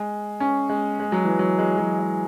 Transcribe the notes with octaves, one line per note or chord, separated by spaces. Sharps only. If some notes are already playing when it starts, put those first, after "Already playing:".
Already playing: G#3
C#4
G#3
G#3
F#3
E3
F#3
G#3
F#3
G#3